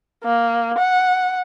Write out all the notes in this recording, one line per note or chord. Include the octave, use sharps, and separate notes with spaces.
A#3
F#5